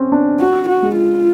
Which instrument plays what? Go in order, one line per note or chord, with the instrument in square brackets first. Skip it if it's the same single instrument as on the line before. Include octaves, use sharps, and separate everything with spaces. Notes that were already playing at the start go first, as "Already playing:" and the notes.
Already playing: [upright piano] C4 C#4
D4
[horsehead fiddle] F#4
F#4
[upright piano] G#3
[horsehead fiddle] F4